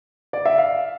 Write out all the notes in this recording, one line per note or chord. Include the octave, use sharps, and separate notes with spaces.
D5
E5
F5